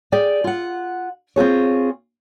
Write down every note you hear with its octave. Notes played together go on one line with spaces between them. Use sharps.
G#4 D5 G5 G#5
F4 F#5
C4 F4 G#4 C#5